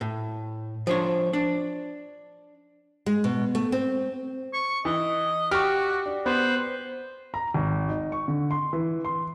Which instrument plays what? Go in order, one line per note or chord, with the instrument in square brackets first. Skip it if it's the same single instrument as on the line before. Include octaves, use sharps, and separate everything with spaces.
[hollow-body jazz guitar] A2
F3 D4 C#5
D4
[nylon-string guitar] G#3
B2
A3
C4
[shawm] C#6
[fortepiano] E3 [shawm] D#5
[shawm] F#4 [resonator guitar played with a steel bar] G4 [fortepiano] C#6 F6
[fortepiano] D4
[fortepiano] B3 [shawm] B4 [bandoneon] C5
[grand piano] A#5
G#1
D#4
C#6
D3
C6
E3
C6